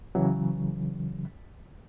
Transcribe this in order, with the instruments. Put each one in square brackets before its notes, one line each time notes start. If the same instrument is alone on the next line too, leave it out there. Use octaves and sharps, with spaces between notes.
[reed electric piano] C#3 E3 F#3